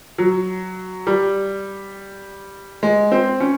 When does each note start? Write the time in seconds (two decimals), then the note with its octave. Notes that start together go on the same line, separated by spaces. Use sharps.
0.18 F#3
1.07 G3
2.83 G#3
3.12 C4
3.40 C#4